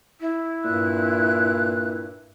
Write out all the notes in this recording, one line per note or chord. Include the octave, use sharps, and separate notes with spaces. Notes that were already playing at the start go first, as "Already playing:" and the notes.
E4
G2 A#2 F#6